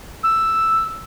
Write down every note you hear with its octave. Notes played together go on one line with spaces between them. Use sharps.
E6